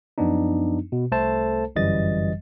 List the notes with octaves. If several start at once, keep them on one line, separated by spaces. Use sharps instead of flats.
F#2 F3 B3 D4 D#4
B2
C2 A3 A4 C5 A5
G1 F#2 E3 G3 D#5 A6